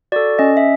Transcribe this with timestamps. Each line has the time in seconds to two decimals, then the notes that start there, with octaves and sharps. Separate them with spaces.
0.12 F#4 A4 D5
0.39 C#4 D#5
0.57 E5